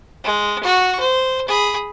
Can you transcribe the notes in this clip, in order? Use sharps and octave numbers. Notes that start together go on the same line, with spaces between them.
G#3
F#4 C#6
C5
G#4 B5